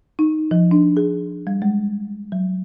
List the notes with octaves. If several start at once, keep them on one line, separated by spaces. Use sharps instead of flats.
D#4
F3
D4
G#4
G3
G#3
F#3